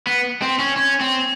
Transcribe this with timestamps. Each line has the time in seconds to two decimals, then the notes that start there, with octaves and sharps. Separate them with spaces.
0.07 B3
0.42 C4
0.59 C#4
0.76 C#4
1.01 C4